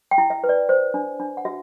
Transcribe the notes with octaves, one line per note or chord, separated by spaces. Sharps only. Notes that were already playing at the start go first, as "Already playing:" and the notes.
G5
E4
E5
B4
D5
C5
D4
D4
F#5
F#4 E5